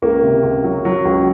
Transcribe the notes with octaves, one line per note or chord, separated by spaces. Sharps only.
C#2 A#3
C3
C#2
F#3
F#3
C#2